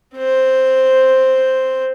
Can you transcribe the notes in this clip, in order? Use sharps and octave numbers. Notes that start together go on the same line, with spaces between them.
C4 C5